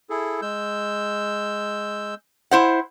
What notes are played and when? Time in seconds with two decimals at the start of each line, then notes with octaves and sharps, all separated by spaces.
0.10 E4 G#4 A4
0.42 G#3 E6 G6
2.51 E4 C5 F#5